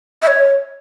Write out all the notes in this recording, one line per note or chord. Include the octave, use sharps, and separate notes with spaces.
E5
C#5